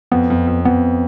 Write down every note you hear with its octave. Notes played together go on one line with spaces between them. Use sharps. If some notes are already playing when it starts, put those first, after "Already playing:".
F2 B3
F2
F2
F2 B3